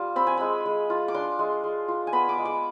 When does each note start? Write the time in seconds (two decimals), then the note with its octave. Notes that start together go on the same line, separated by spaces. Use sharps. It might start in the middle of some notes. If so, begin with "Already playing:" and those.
Already playing: G3 F4
0.16 C4 B5
0.27 G#5
0.37 G#3 B5
0.66 G#3
0.90 F4
1.08 D6
1.14 D4 C6
1.39 G#3
1.64 G#3
1.88 F4
2.07 G#5
2.12 B3 B5
2.29 D6
2.38 G#3
2.45 D6